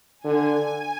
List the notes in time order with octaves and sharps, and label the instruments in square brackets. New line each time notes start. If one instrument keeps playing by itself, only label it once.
[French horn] D3 [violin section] G#5